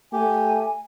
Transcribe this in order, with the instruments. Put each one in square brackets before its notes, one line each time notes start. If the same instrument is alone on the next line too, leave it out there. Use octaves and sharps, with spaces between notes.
[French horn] A3 [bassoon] G4 [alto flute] G#5